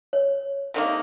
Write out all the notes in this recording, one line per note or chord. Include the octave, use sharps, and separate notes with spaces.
C#5
C3 D#3 A#3